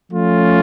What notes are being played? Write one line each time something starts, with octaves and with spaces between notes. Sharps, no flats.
F3 A3 C#4 F4